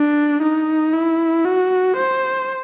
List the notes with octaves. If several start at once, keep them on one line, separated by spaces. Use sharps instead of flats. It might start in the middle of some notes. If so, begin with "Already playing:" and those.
Already playing: D4
D#4
E4
F#4
C5